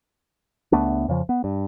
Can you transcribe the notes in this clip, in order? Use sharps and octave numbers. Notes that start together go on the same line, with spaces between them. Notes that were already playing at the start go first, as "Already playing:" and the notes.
C#2 A3 B3 D4
F2 C#3 F3
B3
G2